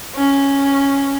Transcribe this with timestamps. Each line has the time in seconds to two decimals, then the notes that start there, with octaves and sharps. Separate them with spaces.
0.15 C#4